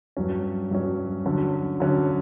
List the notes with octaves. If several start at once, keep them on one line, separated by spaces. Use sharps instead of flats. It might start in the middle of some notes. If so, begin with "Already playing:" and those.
G2 F#3 C#4
G2 F#3 C#4
D3 F#3 C#4
D3 F#3 C#4